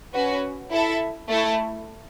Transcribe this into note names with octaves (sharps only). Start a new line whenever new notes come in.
C#4 F#4 B4
E4 A4 E5
A3 E4 A4